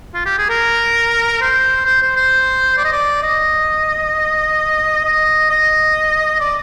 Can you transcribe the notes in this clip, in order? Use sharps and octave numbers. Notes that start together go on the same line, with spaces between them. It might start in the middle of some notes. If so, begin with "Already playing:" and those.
F4
G4
G#4
A#4
C5
C5
C5
C5
D5
D#5
D5
D#5
D#5
D#5
D5